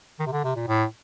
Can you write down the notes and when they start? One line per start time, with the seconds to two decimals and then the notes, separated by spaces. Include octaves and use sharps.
0.19 D#3
0.26 C3
0.32 D3
0.44 C3
0.56 A#2
0.68 A2